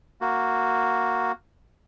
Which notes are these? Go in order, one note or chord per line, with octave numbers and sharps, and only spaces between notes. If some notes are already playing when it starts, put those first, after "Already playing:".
A#3 F#4